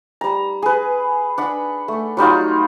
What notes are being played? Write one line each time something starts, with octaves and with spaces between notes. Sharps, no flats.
G3 A#5
G#4 B4
D4 F#5 B5
A3
F#3 G3 D#4 F4